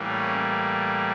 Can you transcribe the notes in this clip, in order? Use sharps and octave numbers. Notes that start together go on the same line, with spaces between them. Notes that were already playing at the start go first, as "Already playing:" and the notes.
Already playing: A2 E3 G3 A#3
C#4